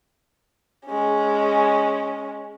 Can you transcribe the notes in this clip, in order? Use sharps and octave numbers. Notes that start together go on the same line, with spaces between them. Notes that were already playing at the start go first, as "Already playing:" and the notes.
G#3 C#4